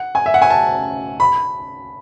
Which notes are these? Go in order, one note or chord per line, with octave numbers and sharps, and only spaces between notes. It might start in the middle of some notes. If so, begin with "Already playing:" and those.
Already playing: F#5
G#5
E5
F#5
G#5
A5
B5